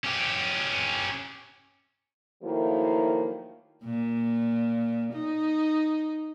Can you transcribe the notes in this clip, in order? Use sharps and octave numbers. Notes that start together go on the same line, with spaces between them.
C#4 G4
D#3 F3 F#3 A3 A#3 E4
A#2
D#4